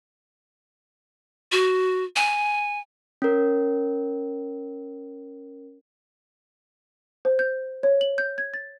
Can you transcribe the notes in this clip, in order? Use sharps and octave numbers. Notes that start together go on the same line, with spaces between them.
F#4
G#5
C#4 A#4
C5
G6
C#5
F#7
G6
G#6
A6